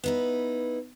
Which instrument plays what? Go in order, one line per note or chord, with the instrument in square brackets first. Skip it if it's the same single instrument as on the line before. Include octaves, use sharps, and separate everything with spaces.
[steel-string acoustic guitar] B3 D#4 E4